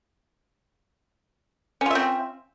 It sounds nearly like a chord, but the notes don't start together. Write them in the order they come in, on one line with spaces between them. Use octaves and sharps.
C#4 F4 E5 C4